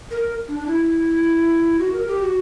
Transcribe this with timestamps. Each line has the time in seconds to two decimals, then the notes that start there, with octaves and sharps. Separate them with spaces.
0.11 A#4
0.48 D4
0.59 D4
0.67 E4
1.79 F#4
1.93 A#4
2.08 G4
2.22 F#4